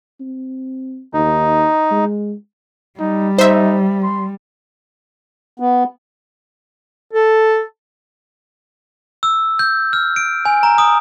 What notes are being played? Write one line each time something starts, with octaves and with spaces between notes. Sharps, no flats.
C4
D#2 D#4
G#3
G3 D#4
D#4 C5 E5
C6
B3
A4
E6
G6
F6
D7
G#5
A#5
D#6